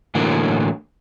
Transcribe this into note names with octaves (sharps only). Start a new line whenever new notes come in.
A2 D3 E3 F#3 A#3